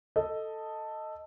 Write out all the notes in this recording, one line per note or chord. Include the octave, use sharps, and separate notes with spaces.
A4 D#5